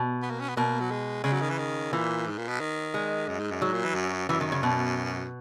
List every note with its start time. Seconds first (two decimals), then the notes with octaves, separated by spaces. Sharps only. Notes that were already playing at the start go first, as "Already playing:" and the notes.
Already playing: B2
0.22 B3
0.31 A#3
0.40 C#4
0.49 B3
0.56 B2 A#3
0.80 F#3
0.91 G#3
1.24 C#3 G#3
1.33 F#3
1.41 D#3
1.50 E3
1.58 D#3
1.92 A#2 E3
2.27 G#2
2.37 A#2
2.48 B2
2.60 D#3
2.94 G#3
3.28 F#2
3.39 G#2
3.51 F#2
3.62 G#2 F#3
3.73 A#2
3.84 E3
3.95 F#2
4.29 F#2 E3
4.41 D#3
4.52 C#3
4.63 B2